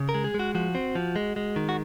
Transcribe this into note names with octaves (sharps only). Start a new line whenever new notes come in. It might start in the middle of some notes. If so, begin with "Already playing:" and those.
Already playing: C#3
A#4
G#3
G#4
G#3
F#4
F3 F#4
C4
F3
G#3
G#3
D#3
F#4